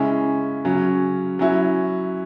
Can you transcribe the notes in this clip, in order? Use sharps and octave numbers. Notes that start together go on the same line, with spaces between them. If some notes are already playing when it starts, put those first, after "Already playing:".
Already playing: C#3 G#3 C#4 E4
C#3 F#3 C#4
F#3 C#4 E4